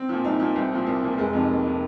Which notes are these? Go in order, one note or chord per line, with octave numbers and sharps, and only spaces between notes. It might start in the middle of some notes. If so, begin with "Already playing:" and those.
Already playing: C4
A#2 F3
C2 D#4
A#2 F3
C2 C4
A#2 F3
C2 A#3
A#2 F3
A#3
F1 G#3
F2 C3 D#3
F1 A#3
C3 D#3